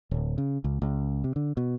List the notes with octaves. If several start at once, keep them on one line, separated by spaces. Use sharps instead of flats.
D1
C#3
C#2
C#2
C3
D3
B2